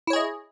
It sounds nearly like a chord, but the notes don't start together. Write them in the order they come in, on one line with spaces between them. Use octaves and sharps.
E4 C#5 G#4 D#5